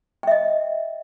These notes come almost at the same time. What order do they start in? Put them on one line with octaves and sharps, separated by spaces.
G5 E5 D#5